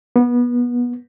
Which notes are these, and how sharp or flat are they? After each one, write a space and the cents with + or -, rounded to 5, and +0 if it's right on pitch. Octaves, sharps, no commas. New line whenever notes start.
B3 -25